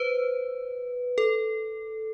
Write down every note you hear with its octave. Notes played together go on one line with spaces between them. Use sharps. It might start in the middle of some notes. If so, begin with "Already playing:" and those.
Already playing: B4 C5
A4